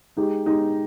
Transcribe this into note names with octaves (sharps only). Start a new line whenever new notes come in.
G#3 D#4 G4
G#3 D#4 G4